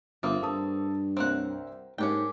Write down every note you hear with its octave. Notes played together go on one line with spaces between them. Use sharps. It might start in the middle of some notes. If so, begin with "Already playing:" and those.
G1 A#3 C4 F4 E5 D#6
G2 A4 A5 D#6
C2 C4 A#4 C#5 F#5
G#2 G#3 A#3 C#4 D4 G4 G5